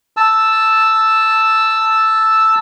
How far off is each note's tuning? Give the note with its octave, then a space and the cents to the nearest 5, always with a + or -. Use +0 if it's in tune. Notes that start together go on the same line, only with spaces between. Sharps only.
A5 +0 E6 +0